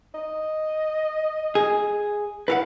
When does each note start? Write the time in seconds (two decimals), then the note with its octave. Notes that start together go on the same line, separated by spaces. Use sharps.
0.14 D#5
1.55 G#4
2.48 E4 B4 F5 F#5